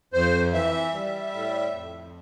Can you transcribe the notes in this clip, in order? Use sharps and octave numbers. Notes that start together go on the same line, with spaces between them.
F2 C5
E3 E5
G3
A2
F2